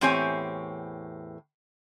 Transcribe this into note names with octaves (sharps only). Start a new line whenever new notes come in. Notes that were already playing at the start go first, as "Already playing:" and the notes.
E2 A2 C4 G4 C#5 G#5